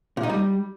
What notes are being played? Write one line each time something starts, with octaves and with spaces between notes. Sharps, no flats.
A#2
D#4
G3